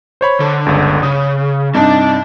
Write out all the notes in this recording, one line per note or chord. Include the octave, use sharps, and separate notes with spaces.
C5 C#5 B5
D3
G1 C#2
C#3 D#6
G2 C3 D4 D#4 A5